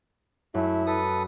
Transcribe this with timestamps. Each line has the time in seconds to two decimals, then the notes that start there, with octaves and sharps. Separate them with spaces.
0.54 F#2 A3 E4
0.86 A4 B4 D#6